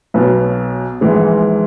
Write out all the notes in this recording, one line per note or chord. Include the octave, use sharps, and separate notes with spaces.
B1 B2 F#3 B4
A#1 G#2 E3 G#3